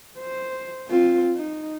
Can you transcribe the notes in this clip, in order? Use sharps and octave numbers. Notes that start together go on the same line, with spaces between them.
C5
C4 F4
D#4